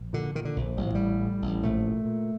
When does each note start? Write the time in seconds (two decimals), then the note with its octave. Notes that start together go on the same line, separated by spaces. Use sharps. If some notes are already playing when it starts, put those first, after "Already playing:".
Already playing: A#1
0.13 A#2 D3
0.35 A#2 D#3
0.45 D3
0.56 A#1
0.77 A1 G3
0.87 F3
0.95 A2 G3
1.20 A2
1.42 A1
1.63 A#1 A3
1.85 A#2
2.05 A#2